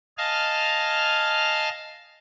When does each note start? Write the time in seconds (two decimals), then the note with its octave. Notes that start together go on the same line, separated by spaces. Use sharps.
0.18 D#5 F5 G#5 A5 F6